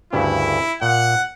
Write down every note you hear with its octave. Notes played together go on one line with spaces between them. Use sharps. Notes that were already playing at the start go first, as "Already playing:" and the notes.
D2 G2 C#3 E4
A#2 F#5